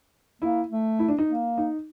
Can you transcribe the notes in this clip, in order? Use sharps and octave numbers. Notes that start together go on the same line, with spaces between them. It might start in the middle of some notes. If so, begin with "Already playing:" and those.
A#3 E4
A3
E4
D4
D#4
A#3
D#4